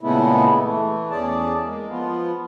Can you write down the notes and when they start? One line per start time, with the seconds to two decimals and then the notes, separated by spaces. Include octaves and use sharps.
0.01 A#2 C#3 G#3 A3 B3 E4
0.64 E3 A3
1.11 E2 C#4 G#4 D5 A5
1.64 G#3 A#3
1.89 F3 B3 F4